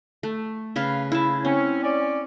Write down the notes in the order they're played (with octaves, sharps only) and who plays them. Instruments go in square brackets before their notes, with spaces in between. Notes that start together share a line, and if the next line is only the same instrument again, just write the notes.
[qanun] A3
C#3 B4 F5
E4 A5
[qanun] C4 [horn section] C#4
[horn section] C#4 D5